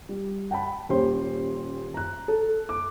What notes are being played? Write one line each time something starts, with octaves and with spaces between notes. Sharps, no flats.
G3
F#5 G5 A5 B5
D#1 C#4 G4 C5 C6
A#5 F#6
A4
D6